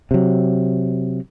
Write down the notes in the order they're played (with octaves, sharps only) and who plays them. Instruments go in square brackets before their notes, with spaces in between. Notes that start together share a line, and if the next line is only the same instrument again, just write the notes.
[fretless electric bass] C3 F#3